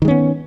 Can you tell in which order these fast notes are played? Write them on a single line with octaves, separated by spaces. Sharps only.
D#3 G#3 C#4 B3